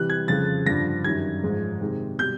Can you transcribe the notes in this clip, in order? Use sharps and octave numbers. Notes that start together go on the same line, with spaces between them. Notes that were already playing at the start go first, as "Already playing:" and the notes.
Already playing: C3 E3 G3 F#6
G#6
F2 C#3 F3 A6
G2 D3 F3 A#6
F#2 D#3 G3 G#6
G#2 F3 G#3
C3 D#3 G#3
B2 G3 G6